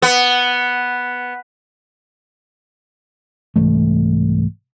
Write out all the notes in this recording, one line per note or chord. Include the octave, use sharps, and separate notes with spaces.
B3
C2 G#2 E3 A3